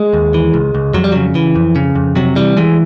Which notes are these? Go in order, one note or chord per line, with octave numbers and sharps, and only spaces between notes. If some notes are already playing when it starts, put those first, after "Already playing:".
Already playing: G#3
D#2
E3
C#2
C#2
F2 F#3
G3
C#3 F#3
E3
F2
C#3
F2
C3 F#3
E3 G3
E3 G#3